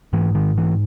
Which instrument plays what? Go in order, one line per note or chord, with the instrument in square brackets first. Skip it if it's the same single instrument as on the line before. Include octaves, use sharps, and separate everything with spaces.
[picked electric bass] G#2 E3
D#3
E3